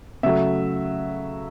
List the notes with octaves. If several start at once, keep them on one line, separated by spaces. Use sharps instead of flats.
C#3 F#3 A3 E5